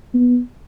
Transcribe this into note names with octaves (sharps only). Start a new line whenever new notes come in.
B3